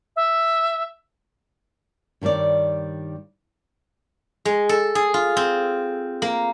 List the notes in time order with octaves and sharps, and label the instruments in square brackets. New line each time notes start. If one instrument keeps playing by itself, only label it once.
[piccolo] E5
[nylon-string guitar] G2 D#3 G3 C#5 D5
[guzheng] G#3
A4
G#4
F4
C4
A#3